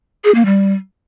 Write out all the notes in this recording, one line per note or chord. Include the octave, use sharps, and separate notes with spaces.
G#4
A#3
G3